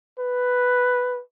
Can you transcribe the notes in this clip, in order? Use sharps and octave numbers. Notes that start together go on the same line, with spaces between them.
B4